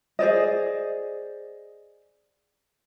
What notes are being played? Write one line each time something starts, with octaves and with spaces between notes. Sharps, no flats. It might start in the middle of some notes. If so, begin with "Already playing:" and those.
G#4 C5 D5 D#5